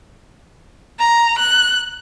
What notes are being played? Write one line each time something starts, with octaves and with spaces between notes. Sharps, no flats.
A#5
F#6